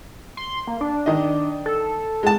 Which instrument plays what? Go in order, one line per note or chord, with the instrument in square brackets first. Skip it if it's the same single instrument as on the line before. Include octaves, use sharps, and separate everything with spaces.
[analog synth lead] C6
A#3
D4
[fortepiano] D#3 D#5
[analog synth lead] A4
[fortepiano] G#3 A5